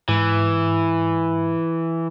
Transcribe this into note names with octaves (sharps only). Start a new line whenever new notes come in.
G#2 E3